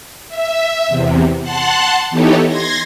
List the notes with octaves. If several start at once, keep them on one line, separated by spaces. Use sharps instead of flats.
E5
E2 C3
F#5 A5 C6 F#6
E3 B3 D#4 G4 A4 C#5
C6 G#6 A#6